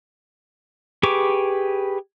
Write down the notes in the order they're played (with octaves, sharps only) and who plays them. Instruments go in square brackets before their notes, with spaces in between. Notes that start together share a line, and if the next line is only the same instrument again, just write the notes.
[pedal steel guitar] G4 G#4 B4 C#6 D6